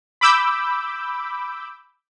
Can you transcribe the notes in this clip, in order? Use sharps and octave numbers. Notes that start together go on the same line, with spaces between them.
B5 D6 E6 G6